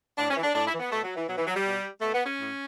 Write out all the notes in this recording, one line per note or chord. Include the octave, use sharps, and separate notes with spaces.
A2 D4
C#4
E3
D4
A2 D4
E4
E3
B3
B2 A3
F#3
E3
B2 F#3
E3
F#3
G3
B2
B2 A3
B3
C#4
A2